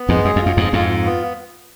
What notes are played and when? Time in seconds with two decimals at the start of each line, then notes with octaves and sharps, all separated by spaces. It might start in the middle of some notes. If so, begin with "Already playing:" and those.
Already playing: B3
0.09 F2 G#2 G#3
0.25 F#2 G#4
0.36 F2
0.42 F#2 F4
0.57 F2 G#2 G#4
0.73 F2 G#2 F4
0.89 F4
1.06 B3